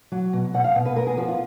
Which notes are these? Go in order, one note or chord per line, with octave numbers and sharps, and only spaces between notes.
F#3
B2
B2 F#5
F5
B2
B4
B3 A#4
G#4
F3 F#4
F4